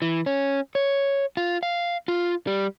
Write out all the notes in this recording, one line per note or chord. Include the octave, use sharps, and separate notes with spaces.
E3
C#4
C#5
F4
F5
F4
G3